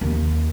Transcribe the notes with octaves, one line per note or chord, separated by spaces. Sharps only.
D#2